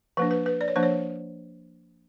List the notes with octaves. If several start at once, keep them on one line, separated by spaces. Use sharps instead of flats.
F3 A#3 D4 B4
B4
B4
D5
C#5
F3 A#3 D4 C5
C#5